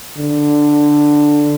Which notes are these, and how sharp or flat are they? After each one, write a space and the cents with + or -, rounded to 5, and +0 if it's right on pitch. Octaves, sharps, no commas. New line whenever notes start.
D3 +5